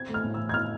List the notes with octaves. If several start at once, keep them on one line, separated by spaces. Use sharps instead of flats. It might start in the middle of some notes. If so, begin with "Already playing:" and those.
Already playing: C4 G#6
A3
F6
A2
E3 E6
G#6
C4 F6